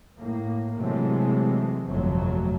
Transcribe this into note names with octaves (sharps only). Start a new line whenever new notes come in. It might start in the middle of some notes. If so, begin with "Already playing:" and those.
A2 A#3
C3 E3 F#3 G#3 A3
G1 F2 C3 F#3 A3